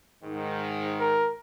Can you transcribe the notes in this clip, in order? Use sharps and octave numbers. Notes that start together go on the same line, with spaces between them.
G#2 D#3
A#4